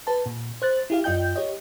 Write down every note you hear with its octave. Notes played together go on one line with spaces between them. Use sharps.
B4 A5
A#2
C5 F#6 A6
E4 G4 F5
F#2 F4 D#5 G5 G6
G4 C#5 D#5